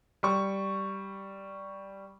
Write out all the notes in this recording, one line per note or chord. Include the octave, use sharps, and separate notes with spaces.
G3 C#6